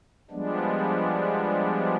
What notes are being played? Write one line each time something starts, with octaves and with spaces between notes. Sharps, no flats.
F3 G3 G#3 B3 D4